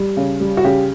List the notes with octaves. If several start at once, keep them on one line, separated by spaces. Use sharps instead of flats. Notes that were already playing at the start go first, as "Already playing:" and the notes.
Already playing: G3
C#3
G3
F#4
C#3 G4